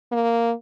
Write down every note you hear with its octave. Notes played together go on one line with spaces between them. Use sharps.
A#3